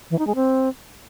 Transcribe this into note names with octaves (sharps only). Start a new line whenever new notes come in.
E3
D#4
G#3
C4